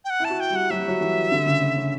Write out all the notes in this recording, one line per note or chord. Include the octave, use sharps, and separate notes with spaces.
G5
F#5
E4 A5
F#4
G5
G3
F#5
F#3 E5
G3
F#3
E3
D3
C#3
C#3
C#3